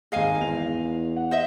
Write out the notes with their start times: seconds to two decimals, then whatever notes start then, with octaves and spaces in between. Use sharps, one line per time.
0.12 G#1 G#3 G#4 D#5 F5 G#5
0.41 E2 F7
1.16 F#5
1.31 C5 D#5 E5